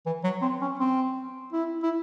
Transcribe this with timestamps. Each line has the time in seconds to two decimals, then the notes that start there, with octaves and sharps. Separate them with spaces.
0.06 E3
0.24 F#3
0.42 C4
0.61 C#4
0.79 C4
1.53 E4
1.83 E4